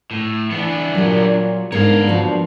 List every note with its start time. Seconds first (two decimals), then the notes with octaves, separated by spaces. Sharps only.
0.11 A2
0.51 E3 B3 D4
0.95 A#2 F#3 G4
1.72 G#2 A#3 B3 D4 A#4 C#5 F5
2.08 F3 F#4